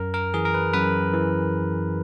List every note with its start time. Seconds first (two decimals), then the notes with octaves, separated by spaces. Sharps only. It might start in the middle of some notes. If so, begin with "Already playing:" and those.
Already playing: F#2 A#4
0.14 A#4
0.34 E3 G#4
0.45 A#4
0.54 B4
0.73 F#2 B4
1.14 E3